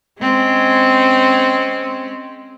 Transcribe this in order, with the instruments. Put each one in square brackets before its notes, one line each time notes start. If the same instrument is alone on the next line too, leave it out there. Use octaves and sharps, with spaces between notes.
[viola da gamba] G#3 C4 C#4